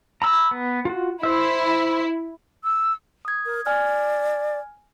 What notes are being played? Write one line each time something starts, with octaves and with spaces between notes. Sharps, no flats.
A#5 B5 E6
B3
F4 F#4
E4 C5 E5
E6
D#6 G#6
A#4
D5 G#5 F6 G#6